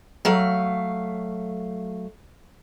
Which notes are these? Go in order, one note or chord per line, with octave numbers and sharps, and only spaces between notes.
F#3 A3 F5